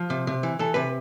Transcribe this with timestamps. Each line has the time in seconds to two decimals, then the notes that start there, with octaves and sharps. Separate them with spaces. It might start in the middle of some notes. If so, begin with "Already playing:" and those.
Already playing: F3
0.10 C3
0.27 C3
0.43 E3
0.59 E3 A4
0.74 C3 B4